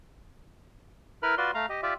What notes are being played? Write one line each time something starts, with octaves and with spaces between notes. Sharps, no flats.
E4 A#4 B4 B5 F6
F4 F#4 B4 D5 C6
A3 F5 A#5
G4 D#5
F4 G4 D5 E5